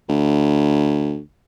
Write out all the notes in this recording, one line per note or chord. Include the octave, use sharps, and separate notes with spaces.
D2